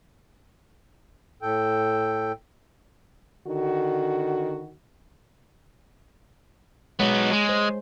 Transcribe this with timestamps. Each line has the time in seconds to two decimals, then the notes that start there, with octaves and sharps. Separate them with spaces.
1.42 A2 A4 G5
3.46 D3 D#3 F#4
7.00 F#3 G#3 B3 C#5
7.32 G#3
7.49 C5